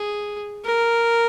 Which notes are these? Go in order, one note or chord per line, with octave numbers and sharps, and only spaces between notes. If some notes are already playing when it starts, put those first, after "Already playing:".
Already playing: G#4
A#4